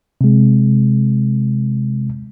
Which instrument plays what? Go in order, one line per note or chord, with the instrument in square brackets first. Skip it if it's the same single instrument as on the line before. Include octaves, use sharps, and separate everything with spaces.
[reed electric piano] C3 G#3